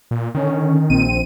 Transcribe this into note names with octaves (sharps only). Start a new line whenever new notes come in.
A#2
D3 D#3 C#4
A#1 C4 D#7